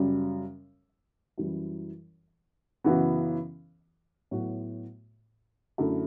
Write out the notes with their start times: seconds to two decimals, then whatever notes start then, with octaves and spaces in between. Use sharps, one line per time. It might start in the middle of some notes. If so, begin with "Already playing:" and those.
Already playing: F#2 C#3 G3
1.38 F#2 E3 G3
2.84 F#2 C#3 E3 B3 F#4
4.31 A2 F#3 B3 F#4
5.78 F#2 D3 A3 E4